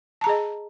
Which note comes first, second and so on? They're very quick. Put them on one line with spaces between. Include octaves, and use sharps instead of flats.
A5 A#5 G#4 D#5